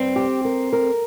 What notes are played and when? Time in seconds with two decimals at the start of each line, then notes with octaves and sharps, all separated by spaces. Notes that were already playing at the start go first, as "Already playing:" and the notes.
Already playing: G2 C4
0.16 G4
0.45 A#4
0.73 A#4